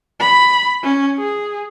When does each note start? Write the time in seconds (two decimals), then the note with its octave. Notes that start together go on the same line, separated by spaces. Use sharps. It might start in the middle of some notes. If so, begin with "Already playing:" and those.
0.20 B5
0.83 C#4
1.18 G#4